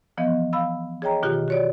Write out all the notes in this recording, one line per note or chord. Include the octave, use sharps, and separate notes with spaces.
E3 F3 B3 D#5
F5 B5 E6
G#4 C#5 D#5 G5 A#5
B2 D#3 F4 G4
F#4 C#5 D5